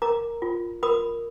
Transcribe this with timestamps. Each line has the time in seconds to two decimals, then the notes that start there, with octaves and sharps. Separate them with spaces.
0.02 A#4 A#5 D6
0.42 F4
0.83 A#4 B5 D#6